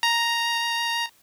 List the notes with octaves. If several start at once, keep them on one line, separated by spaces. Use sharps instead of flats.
A#5